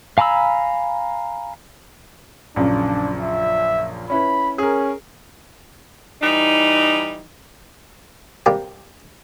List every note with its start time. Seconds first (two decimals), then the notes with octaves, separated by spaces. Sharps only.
0.18 F5 G#5 A#5 B5 E6
2.56 A#1 F#2 C#3 D4
3.21 E5
4.10 C#4 E4 B4 B5
4.58 C#4 G#4 A#4
6.21 E3 G3 D#4
8.46 C3 G3 A#3 G4